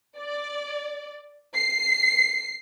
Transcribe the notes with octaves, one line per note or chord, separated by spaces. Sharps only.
D5
C7